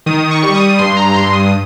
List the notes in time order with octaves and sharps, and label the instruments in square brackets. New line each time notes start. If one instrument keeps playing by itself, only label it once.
[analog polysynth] D#3 D#6
C#6
G3
D#6
G2 C6
A#5
G2 C6
D#6